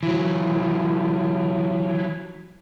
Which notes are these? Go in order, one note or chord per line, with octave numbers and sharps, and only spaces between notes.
E3 F#3